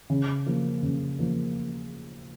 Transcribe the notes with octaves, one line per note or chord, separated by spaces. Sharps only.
C#3
F3 A#3
C#3
F3 A#3